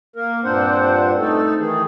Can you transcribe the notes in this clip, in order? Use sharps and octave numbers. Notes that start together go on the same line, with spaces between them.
A#3 A#4
G2 A#2 C4 D4 C5 F#5
A3 D#4 A4
D#3 E3 G#4